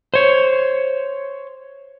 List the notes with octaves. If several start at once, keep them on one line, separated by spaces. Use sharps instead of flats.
C5 C#5